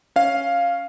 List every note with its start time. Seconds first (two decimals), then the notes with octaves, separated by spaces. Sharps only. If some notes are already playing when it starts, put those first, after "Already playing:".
0.16 C#4 F5